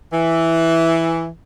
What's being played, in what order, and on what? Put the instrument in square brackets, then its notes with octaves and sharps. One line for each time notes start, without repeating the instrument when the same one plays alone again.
[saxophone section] E3